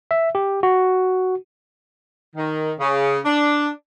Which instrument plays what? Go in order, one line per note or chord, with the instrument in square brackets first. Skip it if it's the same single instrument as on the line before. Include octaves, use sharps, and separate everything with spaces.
[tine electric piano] E5
G4
F#4
[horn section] D#3
C#3
D4